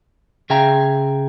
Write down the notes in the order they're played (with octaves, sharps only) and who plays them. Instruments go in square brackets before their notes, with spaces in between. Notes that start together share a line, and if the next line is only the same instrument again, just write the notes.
[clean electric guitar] C#3 G#4 E5 F5 G5 A#5